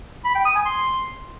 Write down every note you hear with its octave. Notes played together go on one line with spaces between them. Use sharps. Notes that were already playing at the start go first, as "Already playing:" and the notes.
B5
G5
D#6
G#5
C6